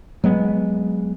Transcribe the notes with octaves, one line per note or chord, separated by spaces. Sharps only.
F#3 G#3 B3